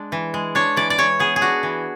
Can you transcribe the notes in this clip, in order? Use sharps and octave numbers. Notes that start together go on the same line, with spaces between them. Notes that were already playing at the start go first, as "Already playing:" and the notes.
Already playing: G#3 D4
E3
G#3
D4 C#5
E3 D5
D5
E3 C#5
B3 G#4
G#4
D4 F#4
E3